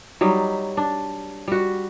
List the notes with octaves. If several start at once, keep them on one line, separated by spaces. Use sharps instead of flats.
F#3 G3 D#4
D4
G3 F#4